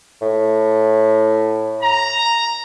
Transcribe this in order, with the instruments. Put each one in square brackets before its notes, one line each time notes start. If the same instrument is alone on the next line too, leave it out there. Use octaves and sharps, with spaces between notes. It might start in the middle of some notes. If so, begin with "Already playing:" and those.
[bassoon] A2
[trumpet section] A#5